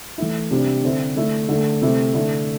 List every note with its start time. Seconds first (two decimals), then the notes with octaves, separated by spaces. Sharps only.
0.18 E3 A3 E4
0.51 C3 G3 D4
0.84 D3 C4 E4
1.17 D3 A3 E4
1.49 D3 A3 E4
1.82 C3 A3 E4
2.14 D3 A3 E4